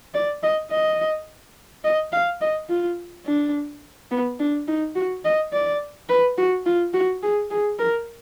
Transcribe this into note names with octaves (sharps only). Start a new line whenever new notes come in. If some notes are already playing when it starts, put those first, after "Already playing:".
D5
D#5
D#5
D#5
F5
D#5
F4
D4
B3
D4
D#4
F#4
D#5
D5
B4
F#4
F4
F#4
G#4
G#4
A#4